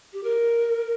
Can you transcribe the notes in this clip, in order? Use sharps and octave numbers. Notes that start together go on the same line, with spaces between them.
G4
A#4